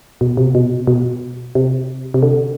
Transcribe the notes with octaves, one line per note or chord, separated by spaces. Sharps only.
B2
C3
B2
B2
C3
C3
D3